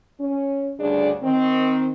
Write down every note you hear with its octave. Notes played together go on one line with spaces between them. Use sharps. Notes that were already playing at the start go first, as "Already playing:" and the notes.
C#4
D2 G2 C#3 D4 G#4 D5
D#3 C4